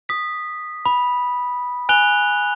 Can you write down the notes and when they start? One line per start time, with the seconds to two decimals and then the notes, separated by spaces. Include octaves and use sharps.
0.09 D#6 B6
0.86 B5
1.89 G#5 F#6 F7 G7